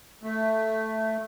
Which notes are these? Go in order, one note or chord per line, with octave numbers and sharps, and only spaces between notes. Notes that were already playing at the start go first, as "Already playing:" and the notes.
A3